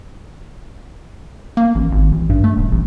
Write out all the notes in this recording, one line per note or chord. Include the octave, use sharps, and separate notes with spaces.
A#3
A1
G#1
A1
G2
A3
D#1
A1